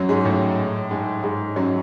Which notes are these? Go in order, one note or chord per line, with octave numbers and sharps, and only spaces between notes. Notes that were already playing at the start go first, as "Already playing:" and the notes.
Already playing: F#2 F#3
G#2 G#3
A2 A3
G#2 G#3
G#2 G#3
F#2 F#3